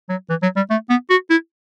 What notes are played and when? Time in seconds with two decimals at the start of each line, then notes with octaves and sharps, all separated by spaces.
0.09 F#3
0.29 E3
0.42 F#3
0.56 G3
0.70 A3
0.89 B3
1.10 F#4
1.30 E4